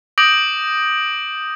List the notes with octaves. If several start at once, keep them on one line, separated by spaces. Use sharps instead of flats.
D6 D#6 G6 A#6 D7 F#7